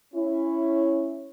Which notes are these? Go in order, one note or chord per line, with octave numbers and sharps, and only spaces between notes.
C#4 E4